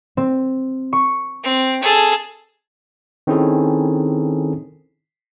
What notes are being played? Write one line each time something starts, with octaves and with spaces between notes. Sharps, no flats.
C4
C#6
C4
G#4 A4
D#3 C4 C#4 E4 G#4 A4